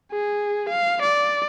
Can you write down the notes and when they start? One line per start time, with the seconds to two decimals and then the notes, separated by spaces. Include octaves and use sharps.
0.12 G#4
0.69 F5
1.02 D5